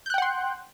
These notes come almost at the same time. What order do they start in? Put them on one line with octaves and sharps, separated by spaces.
G6 F#6 G5 F#5 C6